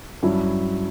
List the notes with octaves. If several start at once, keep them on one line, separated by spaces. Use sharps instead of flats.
G2 F#3 C#4 E4